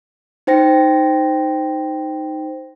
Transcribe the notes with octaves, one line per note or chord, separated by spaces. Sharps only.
D#4 C5 G5 A#6